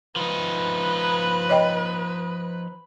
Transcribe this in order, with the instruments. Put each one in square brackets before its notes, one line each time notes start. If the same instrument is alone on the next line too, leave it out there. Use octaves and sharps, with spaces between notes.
[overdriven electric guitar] F3 D#4 [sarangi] B4
[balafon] C#5 D#5 G5